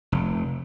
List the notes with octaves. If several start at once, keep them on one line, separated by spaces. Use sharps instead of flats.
F1